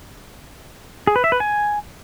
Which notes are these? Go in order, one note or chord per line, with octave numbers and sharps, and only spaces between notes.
G#4
B4
E5
B4
G#5